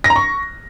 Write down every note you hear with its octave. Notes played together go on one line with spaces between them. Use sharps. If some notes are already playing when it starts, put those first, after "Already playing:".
A#6
A#5
C#6